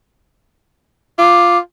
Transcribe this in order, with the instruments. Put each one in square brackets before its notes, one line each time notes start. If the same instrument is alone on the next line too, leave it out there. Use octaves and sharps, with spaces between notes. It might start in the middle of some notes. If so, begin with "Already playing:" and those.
[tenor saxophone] F4 [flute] D6